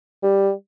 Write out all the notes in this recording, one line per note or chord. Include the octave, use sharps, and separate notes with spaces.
G3